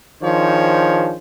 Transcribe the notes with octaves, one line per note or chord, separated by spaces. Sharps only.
D#3 F3 D4 G#4 C5 C#5